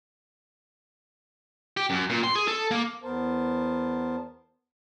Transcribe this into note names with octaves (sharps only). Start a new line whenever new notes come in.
G4
F#2
A#2
C6
G#4
A4
A#3
E2 B3 A#4 C5 A5